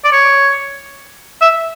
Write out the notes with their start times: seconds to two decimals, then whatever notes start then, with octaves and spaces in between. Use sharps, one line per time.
0.04 D5
0.12 C#5
1.42 E5